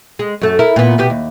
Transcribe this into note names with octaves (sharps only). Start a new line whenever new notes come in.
G#3
F#2 A3
E4 A#4
A#2 B3
B2 B3 G4
D#2